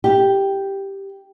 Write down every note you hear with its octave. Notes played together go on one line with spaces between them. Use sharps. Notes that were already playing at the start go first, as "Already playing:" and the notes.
G4